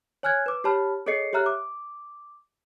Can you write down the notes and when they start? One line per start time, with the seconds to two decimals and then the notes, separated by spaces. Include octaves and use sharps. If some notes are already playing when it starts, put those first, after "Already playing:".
0.23 C#5 G#5 F6 F#6 G#6
0.46 B4 D6
0.64 G4 C#5 A5 B5 F6
1.06 G#4 A4 C#5 D#5 C7 C#7
1.33 G4 C#5 E5 A#5 F6 F#6
1.46 D6